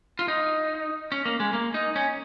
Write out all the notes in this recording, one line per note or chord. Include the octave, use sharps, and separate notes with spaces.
F4
D#4
C#4
A#3
G#3
A#3
D#4
C#4